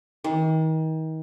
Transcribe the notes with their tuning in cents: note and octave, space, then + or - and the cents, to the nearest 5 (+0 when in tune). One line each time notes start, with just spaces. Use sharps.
D#3 +35